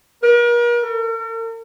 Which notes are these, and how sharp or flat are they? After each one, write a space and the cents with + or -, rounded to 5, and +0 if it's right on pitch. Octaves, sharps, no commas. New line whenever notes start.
A#4 +40
A#4 -45